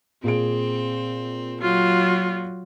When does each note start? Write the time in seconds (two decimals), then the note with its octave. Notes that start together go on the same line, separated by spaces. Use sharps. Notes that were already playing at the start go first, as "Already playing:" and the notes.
0.24 A#2 C4 G#4 D7
1.62 F#3 F4